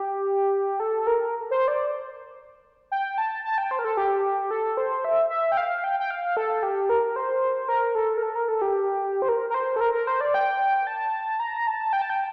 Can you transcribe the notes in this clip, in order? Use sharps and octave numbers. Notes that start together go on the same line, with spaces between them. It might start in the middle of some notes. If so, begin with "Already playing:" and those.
Already playing: G4
A4
A#4
C5
D5
G5
A5
A5
G5
C5
A#4
A4
G4
A4
C5
E5
E5
G5
F5
G5
G5
F5
A4
G4
A#4
C5
A#4
A4
A#4
A4
A#4
A4
G4
C5
A#4
A#4
C5
A4
A#4
A#4
C5
D5
G5
A5
A#5
A5
G5
A5
G5